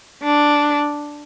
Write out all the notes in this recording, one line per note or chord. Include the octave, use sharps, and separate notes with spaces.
D4